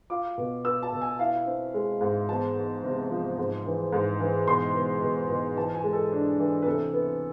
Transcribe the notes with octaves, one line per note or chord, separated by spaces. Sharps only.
F4 D6
B2
B3 E6
A5
B2
G#5
E4 F5
C4
G#3
G#2
E2 A5
E2
C3
F3
G#2
E3
G#2
E3
B2 C6
B2
B2
B2
E3 A5
G#5
G#3
A4
D4
E3
B4
C3 A4
B3